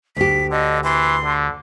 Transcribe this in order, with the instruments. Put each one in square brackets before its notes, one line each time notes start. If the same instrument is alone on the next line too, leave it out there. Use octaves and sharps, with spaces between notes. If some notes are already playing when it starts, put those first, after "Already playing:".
[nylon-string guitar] D2 G4 [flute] B6
[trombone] D3 [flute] D#5
[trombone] E3 [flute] C6
[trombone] D3